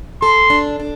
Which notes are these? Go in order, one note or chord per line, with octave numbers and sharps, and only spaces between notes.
A4 C6
D4
D4